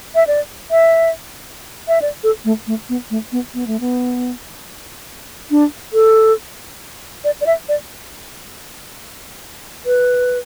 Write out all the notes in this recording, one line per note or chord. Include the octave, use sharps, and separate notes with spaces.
E5
D5
E5
E5
D5
A4
A3
A3
B3
A3
B3
B3
A3
B3
D4
A4
D5
D5
E5
D5
B4